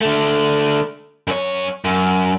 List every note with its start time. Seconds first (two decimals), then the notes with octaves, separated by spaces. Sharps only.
0.01 D3 A3
1.27 F#2 C#5
1.85 F#2